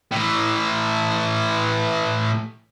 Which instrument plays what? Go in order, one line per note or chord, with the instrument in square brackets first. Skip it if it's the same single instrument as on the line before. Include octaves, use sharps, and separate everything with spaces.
[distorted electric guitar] A2 E3